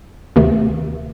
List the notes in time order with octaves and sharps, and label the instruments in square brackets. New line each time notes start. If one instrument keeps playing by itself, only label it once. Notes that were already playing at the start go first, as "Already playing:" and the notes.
[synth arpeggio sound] D2 C3 D#3 A3